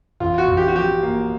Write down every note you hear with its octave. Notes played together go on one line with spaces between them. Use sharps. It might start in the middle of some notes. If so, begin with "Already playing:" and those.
A1 F4
F#4
A1
G4
F#4
F3 G4
A#3